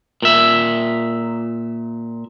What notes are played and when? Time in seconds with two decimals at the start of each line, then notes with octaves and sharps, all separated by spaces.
0.22 A#2 E5